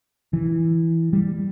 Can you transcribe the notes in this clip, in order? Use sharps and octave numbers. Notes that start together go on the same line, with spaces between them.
E3
G3